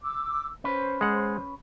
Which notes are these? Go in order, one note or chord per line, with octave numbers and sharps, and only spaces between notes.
D6 E6
C#4 B4 C5
G#3 F#5